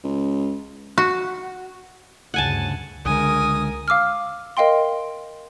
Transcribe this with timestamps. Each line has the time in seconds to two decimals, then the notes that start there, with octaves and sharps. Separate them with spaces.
0.04 C#2
0.98 F#4
2.34 D2 G2 C#3 F#5 G#5 A5
3.05 C#2 D3 G#3 A#4 G#5 D#6
3.88 F5 D6 E6 F6
4.57 A#4 D#5 F5 G5 C6